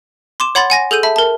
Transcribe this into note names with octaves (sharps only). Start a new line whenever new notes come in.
C6 D6 E7
C#5 F#5 B5 C6 A6
F#5 G#5 A#6
G#4 A4 G6 D#7
E5 A5 B5
A#4 A5